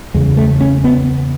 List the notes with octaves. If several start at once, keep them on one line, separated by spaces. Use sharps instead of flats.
E2 C#3 G#3
A3
C#4
B3